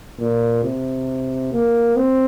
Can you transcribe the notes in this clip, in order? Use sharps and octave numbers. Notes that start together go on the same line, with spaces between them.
A#2
C3
A#3
C4